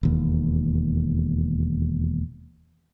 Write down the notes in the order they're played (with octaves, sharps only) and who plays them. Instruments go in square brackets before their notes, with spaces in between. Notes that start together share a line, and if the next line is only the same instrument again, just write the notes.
[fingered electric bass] E1 D#2